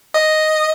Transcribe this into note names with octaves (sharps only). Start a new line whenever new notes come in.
D#5